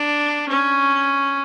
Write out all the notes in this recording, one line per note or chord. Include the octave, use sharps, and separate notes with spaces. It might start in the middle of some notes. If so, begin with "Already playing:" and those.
Already playing: D4
C#4